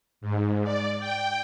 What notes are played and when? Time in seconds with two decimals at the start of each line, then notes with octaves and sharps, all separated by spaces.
0.21 G#2
0.64 D5
1.00 G5